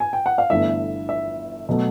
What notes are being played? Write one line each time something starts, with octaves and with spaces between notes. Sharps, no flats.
G#5
G5
F#5
F5
G1 G2 E3 A3 E5
E5
B2 F#3 A3